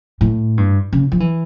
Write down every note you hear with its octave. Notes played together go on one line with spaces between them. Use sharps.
A2
G2
C#3
F3
E3